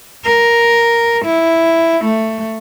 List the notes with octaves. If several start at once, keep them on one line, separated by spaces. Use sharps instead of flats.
A#4
E4
A3